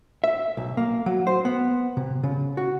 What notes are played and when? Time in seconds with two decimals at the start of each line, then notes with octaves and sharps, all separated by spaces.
0.24 E5
0.57 B1
0.77 A#3
1.06 F#3
1.27 C5
1.45 B3
1.97 C3
2.23 C#3
2.57 F#4